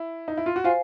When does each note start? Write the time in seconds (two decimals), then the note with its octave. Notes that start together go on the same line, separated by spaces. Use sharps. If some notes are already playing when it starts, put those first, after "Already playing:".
Already playing: E4
0.28 D#4
0.37 E4
0.46 F4
0.56 F#4
0.64 F4 C5 F5 G#5